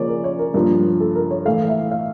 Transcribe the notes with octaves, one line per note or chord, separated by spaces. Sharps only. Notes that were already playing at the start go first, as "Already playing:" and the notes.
Already playing: C#3 F3 A#3 C#5 D5
A#4
C#5
A#4
G2 F3 A#3 A#4
A4
A#4
C#5
A2 E3 A3 F5
E5
F5